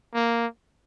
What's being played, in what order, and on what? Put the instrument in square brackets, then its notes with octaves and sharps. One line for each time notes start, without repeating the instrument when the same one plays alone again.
[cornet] A#3